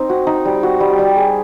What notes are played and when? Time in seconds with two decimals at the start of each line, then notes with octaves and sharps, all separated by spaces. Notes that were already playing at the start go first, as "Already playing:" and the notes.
Already playing: C4 D#4
0.09 F#4
0.27 D#4
0.45 G3
0.63 F#4
0.80 G3
0.99 G3
1.17 G#4